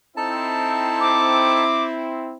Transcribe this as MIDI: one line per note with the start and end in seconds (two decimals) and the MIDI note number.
0.17 2.37 60
0.17 1.64 63
0.17 2.37 64
0.17 1.64 69
0.17 1.64 81
1.00 1.83 86